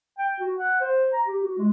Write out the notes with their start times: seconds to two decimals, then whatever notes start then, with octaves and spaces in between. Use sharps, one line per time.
0.18 G5
0.40 F#4
0.59 F#5
0.81 C5
1.13 A#5
1.26 G4
1.43 F#4
1.58 G#3